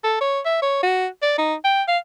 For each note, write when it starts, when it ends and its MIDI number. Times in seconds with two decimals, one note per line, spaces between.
0.04 0.19 69
0.21 0.40 73
0.45 0.60 76
0.62 0.78 73
0.83 1.07 66
1.22 1.33 74
1.38 1.54 63
1.64 1.83 79
1.88 1.98 77